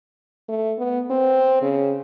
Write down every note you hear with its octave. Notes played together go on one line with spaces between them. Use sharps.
A3
B3
C4
C#3